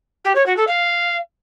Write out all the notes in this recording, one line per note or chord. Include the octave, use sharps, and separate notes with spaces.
G4
C#5
F#4
A4
F5